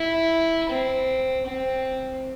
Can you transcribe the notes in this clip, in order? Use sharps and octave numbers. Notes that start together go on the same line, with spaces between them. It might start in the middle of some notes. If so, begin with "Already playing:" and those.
Already playing: E4
C4
C4